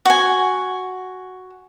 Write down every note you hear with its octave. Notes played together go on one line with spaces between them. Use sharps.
F#4 G#5